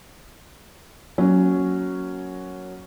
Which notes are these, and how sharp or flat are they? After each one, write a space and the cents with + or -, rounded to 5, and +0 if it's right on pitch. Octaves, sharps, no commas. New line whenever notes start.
F#3 +0 A#3 +0 C#4 +0